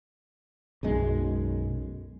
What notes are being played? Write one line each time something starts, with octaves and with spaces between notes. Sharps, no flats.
B1 F#2 G#3